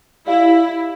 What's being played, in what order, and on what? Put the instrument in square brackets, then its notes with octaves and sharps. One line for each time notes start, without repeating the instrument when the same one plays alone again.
[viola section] E4 [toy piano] G4 D5 F5